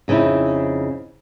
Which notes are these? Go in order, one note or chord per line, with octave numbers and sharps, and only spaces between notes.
F2 C#3 C4 D#4 E4